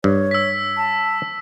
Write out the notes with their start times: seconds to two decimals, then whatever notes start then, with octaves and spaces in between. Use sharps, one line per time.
0.04 G2 C#5
0.31 E6 B6
0.77 A5